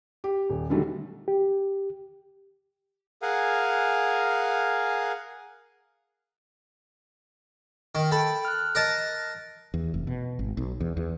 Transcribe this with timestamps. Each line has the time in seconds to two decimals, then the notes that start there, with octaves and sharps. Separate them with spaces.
0.24 G4
0.50 D#1
0.70 D3 D#3 F#3 G3 A3
1.28 G4
3.22 G#4 A#4 F5 F#5 G#5
7.95 D#3
8.11 A4 G5 B5
8.45 F6 F#6
8.75 A#4 D#5 A5
9.74 E2
9.94 F1
10.07 B2
10.39 G#1
10.57 B1
10.81 E2
10.97 E2